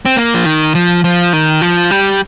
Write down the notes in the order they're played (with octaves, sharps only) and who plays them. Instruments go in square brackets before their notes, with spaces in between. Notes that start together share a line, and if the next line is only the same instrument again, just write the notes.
[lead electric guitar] C4
A#3
F3
D#3
F3
F3
D#3
F3
G3